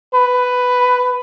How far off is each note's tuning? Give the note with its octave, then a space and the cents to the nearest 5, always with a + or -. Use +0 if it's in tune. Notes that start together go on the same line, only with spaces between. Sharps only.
B4 +10